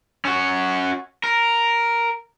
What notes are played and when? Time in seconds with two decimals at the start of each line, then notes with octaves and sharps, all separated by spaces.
0.25 C#4 F#4
1.24 A#4